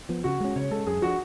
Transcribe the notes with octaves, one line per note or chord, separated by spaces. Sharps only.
F3 B3
C#3 F#4
G#3 C#4
C#3 C#5
G#3 C#4 A4
F#2 G#4
F3 B3 D4 F#4